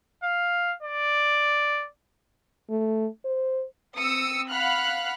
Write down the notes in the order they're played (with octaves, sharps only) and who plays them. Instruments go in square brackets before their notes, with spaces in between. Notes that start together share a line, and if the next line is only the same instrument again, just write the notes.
[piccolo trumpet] F5
D5
[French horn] A3
C5
[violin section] C4 D#6 E6 C#7
F5 F#5 B5 F6 F#6